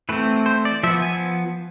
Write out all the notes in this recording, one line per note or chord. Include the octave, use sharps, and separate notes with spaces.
E3 A3 C4 B4
C5
D5
F3 B3 E5
G#5